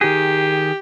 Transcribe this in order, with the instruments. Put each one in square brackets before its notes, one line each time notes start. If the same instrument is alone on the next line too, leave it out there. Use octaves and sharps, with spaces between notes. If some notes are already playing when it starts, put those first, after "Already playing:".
[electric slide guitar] D#3 G#4 [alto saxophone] G4